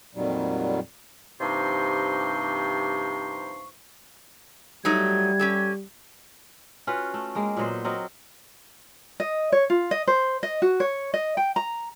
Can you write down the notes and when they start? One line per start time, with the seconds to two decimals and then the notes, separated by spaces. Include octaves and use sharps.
0.15 F2 A#2 D#3 F#3 G3
1.41 G2 C3 F3 D#4 C6 C#6
4.85 F#3 G3 A3 D#4 G#6
5.39 C#4 G4 A4
6.87 C#4 F4 F#4 B4
7.14 A3
7.35 G#3 A#3 G5
7.57 A#2 F#3 B3 C5
7.84 F#3 C4 A#4 D#5
9.20 D#5
9.52 C#5
9.70 F4
9.91 D#5
10.07 C5
10.43 D#5
10.62 F#4
10.80 C#5
11.14 D#5
11.37 G5
11.56 A#5